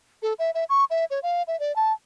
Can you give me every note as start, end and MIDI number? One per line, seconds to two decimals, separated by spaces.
0.23 0.33 69
0.39 0.51 76
0.55 0.64 76
0.69 0.84 85
0.90 1.05 76
1.11 1.20 73
1.23 1.43 77
1.48 1.58 76
1.60 1.74 74
1.76 1.93 81